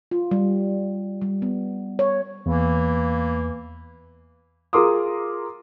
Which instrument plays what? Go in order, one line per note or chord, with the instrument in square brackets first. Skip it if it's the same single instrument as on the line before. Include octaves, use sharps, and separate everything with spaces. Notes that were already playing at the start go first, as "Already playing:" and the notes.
[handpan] F4
G3
G3
B3
C#5
[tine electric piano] E2 [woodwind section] E3 A#3
[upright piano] F4 G#4 A#4 C6 D6 D#6